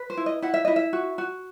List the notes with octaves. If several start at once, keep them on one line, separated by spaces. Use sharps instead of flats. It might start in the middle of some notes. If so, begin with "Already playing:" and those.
Already playing: B4
C5
E4
D#5
E4 F#5
E5
E4 D#5
E5
F#4
F#4